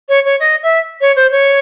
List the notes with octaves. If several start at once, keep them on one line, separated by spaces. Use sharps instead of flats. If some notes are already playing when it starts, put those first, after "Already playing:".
C#5
C#5
D#5
E5
C#5
C5
C#5